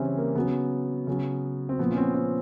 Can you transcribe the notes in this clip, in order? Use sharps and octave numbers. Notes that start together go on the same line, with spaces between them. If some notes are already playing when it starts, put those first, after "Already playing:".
Already playing: C#3 E3 G3 C4 C#4
A#3
C#3 F#3 B3
C#3 F#3
C4
A#2 F3 B3
C#4
C4
C4